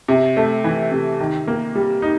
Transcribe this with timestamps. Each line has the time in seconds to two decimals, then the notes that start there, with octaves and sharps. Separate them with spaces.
0.08 C3
0.37 A3
0.64 E3
0.92 C3
1.20 D#3
1.48 A#3
1.75 G3
2.02 D#4